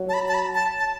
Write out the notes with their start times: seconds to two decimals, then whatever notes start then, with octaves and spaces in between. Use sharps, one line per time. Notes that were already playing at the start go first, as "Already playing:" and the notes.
Already playing: F#3
0.09 A5
0.14 B5
0.28 A5
0.34 B5
0.54 A5
0.79 A5